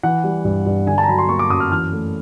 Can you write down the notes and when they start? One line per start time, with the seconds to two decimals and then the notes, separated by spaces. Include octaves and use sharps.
0.03 E3 F#5
0.24 G3
0.45 G2
0.66 G2
0.86 D3 G#5
0.98 A5
1.03 A#5
1.08 F#3 B5
1.18 C6
1.29 A#3 C#6
1.39 D6
1.50 F#2 D#6
1.60 F6
1.72 E3 F6
1.92 A3